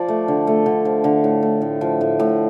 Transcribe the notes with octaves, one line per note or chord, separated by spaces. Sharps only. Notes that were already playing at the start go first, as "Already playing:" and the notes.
Already playing: F3 D5
A3
D3
A3
D3
F3
D3
A2
A2
A2
F3
A2
A2